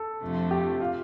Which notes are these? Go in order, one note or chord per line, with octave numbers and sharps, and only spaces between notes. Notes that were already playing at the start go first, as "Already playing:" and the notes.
Already playing: A4
F2 C3 F3 A3 D4
G4
F4